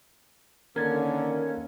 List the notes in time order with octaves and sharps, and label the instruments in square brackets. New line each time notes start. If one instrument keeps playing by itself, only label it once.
[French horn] D3 [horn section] D#3 A#3 [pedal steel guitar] C#4 [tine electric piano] A#4 G#6 A6